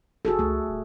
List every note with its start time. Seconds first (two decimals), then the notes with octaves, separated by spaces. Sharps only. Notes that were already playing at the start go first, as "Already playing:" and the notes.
0.25 F#1 F#4 G#4 A4
0.39 C#2 A3
0.68 D#1